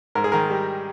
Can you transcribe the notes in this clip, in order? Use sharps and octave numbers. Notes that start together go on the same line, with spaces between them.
G#2 A#4
G#4
D#3 A#4
G3